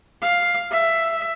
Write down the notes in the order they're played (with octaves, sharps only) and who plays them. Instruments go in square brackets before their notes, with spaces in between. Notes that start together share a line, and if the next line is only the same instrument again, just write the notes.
[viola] F5
E5